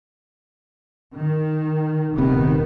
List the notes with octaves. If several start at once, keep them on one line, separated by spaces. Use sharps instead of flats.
D#3
D#1 C3 D#3 B3